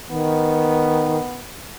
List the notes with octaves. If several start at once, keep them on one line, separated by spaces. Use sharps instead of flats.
D#3 B3